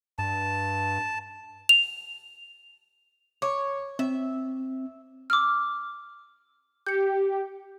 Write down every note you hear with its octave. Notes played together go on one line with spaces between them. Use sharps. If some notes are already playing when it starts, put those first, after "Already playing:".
G2 A5
F7
C#5 D6
C4 E5
D6 E6 F6
G4 G6 C#7